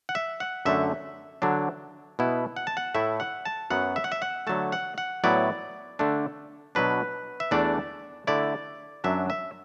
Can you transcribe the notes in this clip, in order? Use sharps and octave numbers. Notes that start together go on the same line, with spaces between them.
F#5
E5
F#5
F#2 D3 A3 E5
D3 F#3 D4
B2 B3 E4
F#5
A5
F#5
A2 A3 E4 E5
F#5
A5
F#2 F#3 B3 F#5
E5
F#5
E5
F#5
D3 F#3 A3 A5
F#5
F#5
A2 F#3 B3 E4 D5
D3 A3 D4
B2 F#3 D4 B4
E5
E2 E3 A3 D4 D5
D3 A3 E4 D5
F#2 F#3 D4 E5
E5